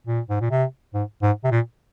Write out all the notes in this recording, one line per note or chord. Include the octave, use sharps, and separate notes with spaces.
A#2
G#2
A#2
C3
G#2
G#2
C3
A#2